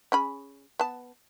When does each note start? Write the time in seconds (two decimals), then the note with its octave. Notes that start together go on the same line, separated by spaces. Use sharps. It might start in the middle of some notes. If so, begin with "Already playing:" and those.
0.12 C#4 G#4 B5
0.80 B3 A5